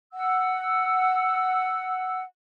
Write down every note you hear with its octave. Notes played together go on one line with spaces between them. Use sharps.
F#5 E6